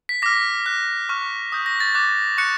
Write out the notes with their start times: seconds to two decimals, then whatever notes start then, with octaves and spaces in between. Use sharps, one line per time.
0.09 B6
0.22 D6 F6 A#6
0.66 D6 F#6
1.09 C#6 F6
1.52 D#6 G6
1.66 A#6
1.80 A6
1.95 D6 F#6
2.38 C#6 F#6 C#7